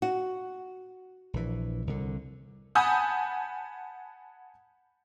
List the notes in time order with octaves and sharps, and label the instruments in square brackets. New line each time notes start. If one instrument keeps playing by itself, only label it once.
[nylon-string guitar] F#4
[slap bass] A#1 E3
C2 D3
[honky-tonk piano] F#5 G#5 A5 B5 D#6 G6